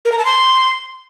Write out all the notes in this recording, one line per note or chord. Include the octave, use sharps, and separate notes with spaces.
A#4
A#5
A5
C6